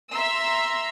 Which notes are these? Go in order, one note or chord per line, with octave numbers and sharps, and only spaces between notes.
E5 A#5 C6 E6